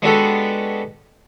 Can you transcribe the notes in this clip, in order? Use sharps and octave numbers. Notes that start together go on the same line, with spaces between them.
G#3 B3 D4 F#4 G4 A4